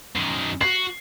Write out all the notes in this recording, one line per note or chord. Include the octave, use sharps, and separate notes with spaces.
F#2 D#3
F#4 C7